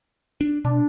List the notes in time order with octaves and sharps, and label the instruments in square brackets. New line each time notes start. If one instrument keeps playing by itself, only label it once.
[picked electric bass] D4
[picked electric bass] B2 [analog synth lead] D4